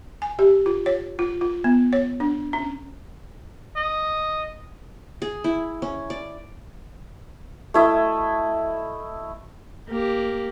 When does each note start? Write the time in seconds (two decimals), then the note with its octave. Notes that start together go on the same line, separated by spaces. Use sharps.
0.22 G#5
0.39 G4
0.66 F4
0.86 C#5
1.19 F4
1.41 F4
1.64 B3
1.93 C#5
2.20 D4
2.53 C#4
3.76 D#5
5.22 G#4
5.44 E4
5.82 C#4
6.10 D5
7.74 A3 E4 D#5
9.89 A#3 G4